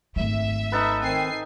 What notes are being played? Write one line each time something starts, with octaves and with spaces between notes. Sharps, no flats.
G#1 A3 E5
D#4 A4 B4
D#3 C4 G#5 C7